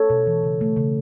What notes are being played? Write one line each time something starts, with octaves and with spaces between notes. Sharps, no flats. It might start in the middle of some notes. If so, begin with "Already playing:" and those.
Already playing: A4 C#5
B2
E3
C#3
A3
C#3